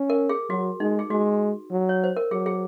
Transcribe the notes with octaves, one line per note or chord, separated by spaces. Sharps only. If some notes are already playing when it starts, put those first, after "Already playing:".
Already playing: C#4
A#4
G#4
F#3 F#4
G#3 D#4
G#4
G#3 F#4
F#3
C#5
C5
A#4
F#3 G#4
G#4